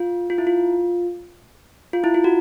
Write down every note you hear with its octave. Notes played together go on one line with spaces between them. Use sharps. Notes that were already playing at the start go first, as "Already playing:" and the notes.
Already playing: F4
F4
E4
F4
F4
E4
F4
F#4